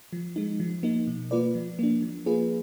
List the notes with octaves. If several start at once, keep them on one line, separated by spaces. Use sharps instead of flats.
F3
G#3 D#4
F3
A#3 D#4
B2
A#3 F4 B4 D5
F3
A#3 D4
F3
A#3 F4 G#4 B4